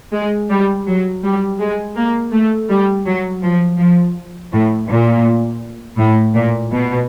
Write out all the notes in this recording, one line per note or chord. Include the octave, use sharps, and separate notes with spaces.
G#3
G3
F#3
G3
G#3
A#3
A3
G3
F#3
F3
F3
A2
A#2
A2
A#2
B2